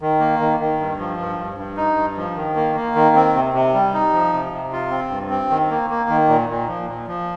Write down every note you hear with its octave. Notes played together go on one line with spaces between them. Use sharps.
D#3
A#3
D#3
D#3
G2
F3
G2
G2
G2
D#4
G2
F3
D#3
A#3
A#3
D#3
C4
C3
C3
G3
D#4
F3
C3
C3
F4
C4
G2
C4
D#3
A#3
A#3
D#3
A#2
A#2
F3
A#2
F3